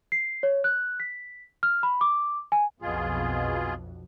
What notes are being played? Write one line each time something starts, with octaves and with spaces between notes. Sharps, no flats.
C7
C#5
F#6
B6
F6
B5
D6
G#5
B1 F2 B2 F4 G#4